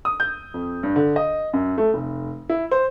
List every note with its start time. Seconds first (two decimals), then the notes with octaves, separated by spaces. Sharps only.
0.05 D#6
0.20 G6
0.54 F2
0.83 G2
0.96 D3
1.16 D#5
1.53 F#2
1.78 A3
1.94 F1
2.49 E4
2.71 C5